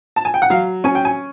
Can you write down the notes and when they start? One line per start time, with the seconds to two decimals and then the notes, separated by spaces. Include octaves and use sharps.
0.16 A5
0.25 G#5
0.34 G5
0.42 F#5
0.50 F#3 F5
0.84 C#4 G#5
0.95 G5
1.05 G#5